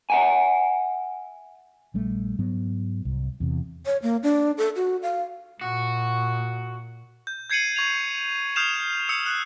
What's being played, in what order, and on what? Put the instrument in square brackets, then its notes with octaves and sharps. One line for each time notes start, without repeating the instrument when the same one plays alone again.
[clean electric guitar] E5 F#5 G#5
[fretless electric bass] A#1 G3 A3
G#2 F#3 B3
C2
E2 C3
[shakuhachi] C#5
A#3
D4
A4
F#4
F5
[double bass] A#2 [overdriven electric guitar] F#4
[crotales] G6
G6 G#6 C7 C#7 D#7 F#7
C#6 G#6 F7
D#6 F6 G6 C7 E7 F7
D#6 E6 C#7
D#6 F#6